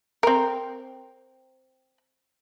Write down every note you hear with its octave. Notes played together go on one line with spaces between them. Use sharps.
C4 A#4